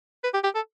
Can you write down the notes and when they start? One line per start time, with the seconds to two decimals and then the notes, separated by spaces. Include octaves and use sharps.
0.24 B4
0.34 G4
0.44 G4
0.55 A4